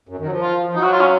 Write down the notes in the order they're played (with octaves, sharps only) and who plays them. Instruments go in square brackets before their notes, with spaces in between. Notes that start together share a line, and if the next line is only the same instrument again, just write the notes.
[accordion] F#2
D#3
F#3
F3
[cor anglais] F4
[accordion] F3
[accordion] F#3 [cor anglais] D#4
[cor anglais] F#4
F4
C#4